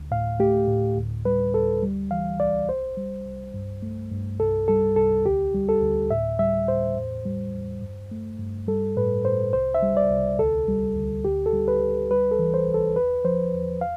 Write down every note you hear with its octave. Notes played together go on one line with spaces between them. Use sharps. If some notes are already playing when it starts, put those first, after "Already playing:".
Already playing: D2
A2 F5
A3 G4
A2
D2
G3 B4
D2 A4
G3
E3 F5
C2 D5
C2 C5
G3
C2
G2
A3
G2
C2 A4
G3 A4
C2 A4
D2 G4
G3
A4
D2
A2 E5
G3 E5
A2 C5
E2
G3
E2
G2
A3
G2
G3 A4
A2 B4
A2 C5
C2 C5
E5
G3
D5
C2
D2 A4
G3
D2
D2 G4
A4
G3
B4
D2
G3 B4
A4
E3
C5
C2
A4
E2 B4
F3 C5
E2
F5